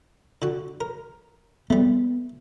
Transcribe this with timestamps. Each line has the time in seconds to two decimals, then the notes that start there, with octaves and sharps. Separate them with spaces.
0.42 D3 F#4
0.81 A#4
1.70 G3 A3 B3